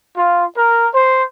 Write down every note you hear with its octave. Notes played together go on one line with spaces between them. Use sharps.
F4
A#4
C5